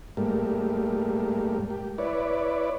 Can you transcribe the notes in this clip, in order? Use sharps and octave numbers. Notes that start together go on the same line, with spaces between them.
G#2 G3 A3 A#3
G4
E4 B4 C#5 D5